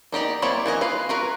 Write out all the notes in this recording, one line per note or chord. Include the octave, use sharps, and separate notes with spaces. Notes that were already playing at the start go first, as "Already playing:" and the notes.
A#3 D#4 G4 D5
A#3 C4 E4 C#5 D5
E3 A#3 D#5 G#5
F4 B4 F5
F4 F#4 A#4 B4